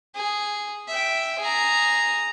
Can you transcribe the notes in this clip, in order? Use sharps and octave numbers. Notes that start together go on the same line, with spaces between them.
G#4
E5 G5
G#4 A#5